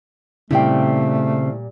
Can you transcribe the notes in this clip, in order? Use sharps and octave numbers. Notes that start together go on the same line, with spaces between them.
A#2 C#3 G3 A3 C4 E4 G5